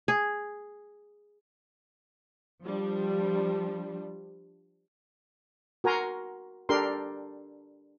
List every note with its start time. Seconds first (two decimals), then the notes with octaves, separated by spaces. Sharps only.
0.08 G#4
2.64 F3 G3 D4
5.84 F#4 A#4 G#5 A#5 C6
6.69 D4 G4 A4 A#4 C6